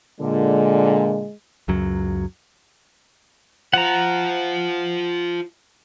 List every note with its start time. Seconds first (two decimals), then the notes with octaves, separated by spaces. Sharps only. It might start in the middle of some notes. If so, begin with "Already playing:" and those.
0.20 A#2 D3 G#3
1.68 C#2 F#2 F#3
3.73 F4 C5 F#5 A#5